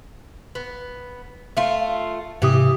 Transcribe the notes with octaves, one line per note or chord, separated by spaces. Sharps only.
B3
A3 F4
G#2 C3 E3 G4 D#6